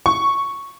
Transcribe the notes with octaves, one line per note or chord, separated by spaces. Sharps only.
C#6